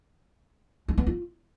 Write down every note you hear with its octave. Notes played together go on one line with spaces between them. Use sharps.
C#4
B3
F4